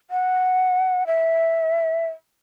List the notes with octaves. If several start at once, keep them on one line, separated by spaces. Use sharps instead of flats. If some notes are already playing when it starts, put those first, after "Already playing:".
F#5
E5